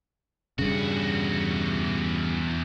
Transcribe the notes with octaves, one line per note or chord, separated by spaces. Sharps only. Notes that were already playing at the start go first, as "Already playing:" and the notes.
E2 G2 C#3 F#4